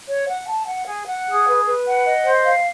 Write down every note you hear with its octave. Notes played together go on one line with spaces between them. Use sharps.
C#5
F#5
A5
F#5
G#4
F#5
G#4
B4
B4
F#5
D#5
C5
F5